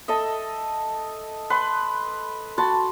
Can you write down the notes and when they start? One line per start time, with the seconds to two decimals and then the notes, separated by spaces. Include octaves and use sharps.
0.08 A4 D#5 E5
1.50 B4 C6
2.58 F#4 A5 B5 C6